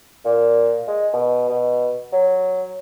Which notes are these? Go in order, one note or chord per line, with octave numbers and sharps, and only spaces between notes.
A#2
G#3
B2
B2
F#3